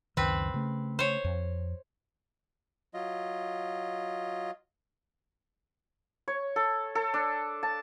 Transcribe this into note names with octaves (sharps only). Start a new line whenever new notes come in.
C#2 F#2 D#3 C4 B4
C#3 A3
C5 C#5
F2
F#3 F4 D#5
C#5
A4
A4
D4
A5